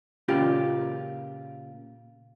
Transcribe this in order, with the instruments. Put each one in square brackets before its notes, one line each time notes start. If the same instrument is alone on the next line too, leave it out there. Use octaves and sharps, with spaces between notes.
[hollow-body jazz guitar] A#2 C#3 F4 G4